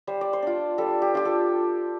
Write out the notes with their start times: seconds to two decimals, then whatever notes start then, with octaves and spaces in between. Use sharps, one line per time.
0.07 G3 C5
0.21 D5
0.33 C5
0.42 D4 F4
0.78 G3 A4
1.02 G4
1.14 D4 F4 G4
1.25 A4